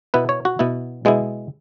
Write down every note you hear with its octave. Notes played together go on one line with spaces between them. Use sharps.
B2 B3 E4 B4
C#5
F#4
B2 B3 E4
B2 G#3 B3 E4